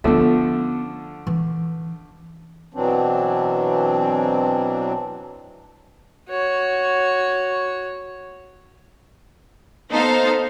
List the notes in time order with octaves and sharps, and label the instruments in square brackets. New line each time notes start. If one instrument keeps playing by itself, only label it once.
[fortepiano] D3 F3 A3 [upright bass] B3 C#4
[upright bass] E3
[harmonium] B2 E3 F#3 C4 D4
[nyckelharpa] F#4 C#5
[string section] B3 D#4 A4 C5 F5 A#5